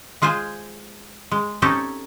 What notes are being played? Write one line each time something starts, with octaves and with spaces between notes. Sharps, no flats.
G#3 F4 G#4 C5 G#5
G#3
C4 C#4 D#4 G4 A4 C#5